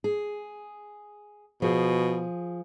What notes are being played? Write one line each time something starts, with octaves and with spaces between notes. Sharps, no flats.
G#4
B2 F3 G#4